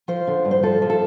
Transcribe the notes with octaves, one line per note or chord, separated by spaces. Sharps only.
F3 C5
D3
G2
C5
F3 A4
F3
A4